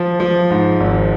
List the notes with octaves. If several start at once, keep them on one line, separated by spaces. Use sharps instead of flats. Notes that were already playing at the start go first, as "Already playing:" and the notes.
Already playing: F3
F3
G#2
G#1